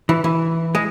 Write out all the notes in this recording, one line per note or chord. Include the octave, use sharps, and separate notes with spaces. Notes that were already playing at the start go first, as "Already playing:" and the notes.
E3
E3
G#3